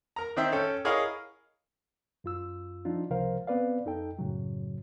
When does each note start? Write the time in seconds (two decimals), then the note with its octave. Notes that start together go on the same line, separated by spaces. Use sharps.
0.16 A#4 A#5
0.36 D#3 C4 E5
0.52 C#4 A4 G5
0.85 E4 G#4 A#4 C#5 D#5 F5
2.24 F#2 F4 E6
2.85 F3 D4 D#4 F4
3.10 C#2 C3 F3 A#4 C5 F5
3.47 B3 C4 B4 D5 F5
3.85 F2 D#4 A4 G5
4.19 F#2 A2 C#3 F#3